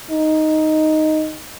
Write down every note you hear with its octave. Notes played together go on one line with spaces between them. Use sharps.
D#4